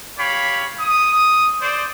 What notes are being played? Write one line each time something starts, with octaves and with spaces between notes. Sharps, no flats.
G4 C#5 F5 B5
D#6
C5 D5